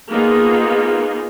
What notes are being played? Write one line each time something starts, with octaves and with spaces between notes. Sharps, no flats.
A#3 B3 D#4 F4 G#4